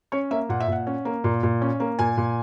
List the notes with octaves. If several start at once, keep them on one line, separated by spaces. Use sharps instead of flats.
C#4 C#5
A#3 E5
A#2 F#5
E5
A#2 F#5
C#4
A#3
A#2
A#2
C#4
A#3
A#2 G#5
A#2